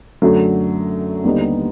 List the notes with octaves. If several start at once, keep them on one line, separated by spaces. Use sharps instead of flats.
F#2 D3 F#3 A3
D#2 D3 G3 B3 D#4